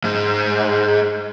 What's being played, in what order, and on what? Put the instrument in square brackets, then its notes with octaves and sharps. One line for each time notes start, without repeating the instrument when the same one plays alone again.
[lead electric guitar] G#2